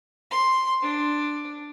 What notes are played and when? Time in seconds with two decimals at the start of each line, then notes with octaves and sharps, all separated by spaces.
0.31 C6
0.82 D4